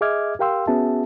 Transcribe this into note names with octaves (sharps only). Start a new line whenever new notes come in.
G#4 D#5 E5 D6 F6 G#6
G4 A#4 F5 G5 C6 E6
B3 C#4 F#4 G#4 E5 A5